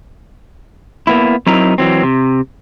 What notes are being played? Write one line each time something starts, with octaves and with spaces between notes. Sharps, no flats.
A#3 B3 E4
F#3 C4 D#4 E4 A#4
E3 F#3 C4
C3